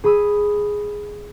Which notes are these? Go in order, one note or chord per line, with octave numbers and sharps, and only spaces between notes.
G#4 B5 D#6 E6